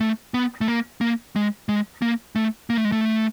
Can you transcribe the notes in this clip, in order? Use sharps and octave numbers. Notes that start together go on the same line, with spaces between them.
A3
B3
A3
A#3
A#3
G#3
G#3
A#3
A3
A#3
A3
G#3
A3